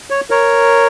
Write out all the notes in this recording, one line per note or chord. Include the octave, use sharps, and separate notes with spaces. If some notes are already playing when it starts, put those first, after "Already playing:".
C#5
A#4 C#5